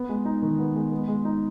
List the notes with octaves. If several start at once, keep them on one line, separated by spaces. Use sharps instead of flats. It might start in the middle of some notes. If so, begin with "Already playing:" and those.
Already playing: B3
G#3
D#4
D#3
B3
G#3
B3
G#3
D#4